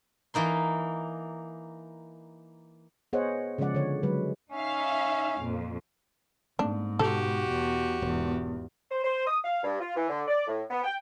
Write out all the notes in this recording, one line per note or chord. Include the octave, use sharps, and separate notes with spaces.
E3 A#3 D#4 C6
B3 G#4 C5 C#5 D#5 F#5
C#3 F3 G#3 D5 F#5
D3 C#5
D3 F#3 G#3 B4
C#4 D#4 E5 F5
F2 A#2
G#2 A3 A#3 C4 D4
B2 F#4 G4 A4
E2
E1 E2 G#2
C5
C5
D#6
F5
G2
F4
E3
D3
D5
A2
B3
G5